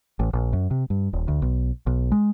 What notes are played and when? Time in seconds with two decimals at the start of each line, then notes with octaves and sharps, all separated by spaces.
0.19 A1
0.33 A#1
0.53 F#2
0.71 C3
0.90 G2
1.13 D#1
1.28 D2
1.42 B1
1.87 B1
2.12 G#3